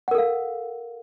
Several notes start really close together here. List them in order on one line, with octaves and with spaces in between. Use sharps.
F#5 A#4 A4 F5